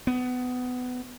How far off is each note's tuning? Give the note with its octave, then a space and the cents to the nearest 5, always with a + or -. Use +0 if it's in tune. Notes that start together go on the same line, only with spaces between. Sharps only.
B3 +20